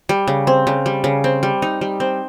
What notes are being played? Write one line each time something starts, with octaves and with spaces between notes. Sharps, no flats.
G3
C#3
C4
C#3
G3
C#3
C4
G3
D#4
G3
C4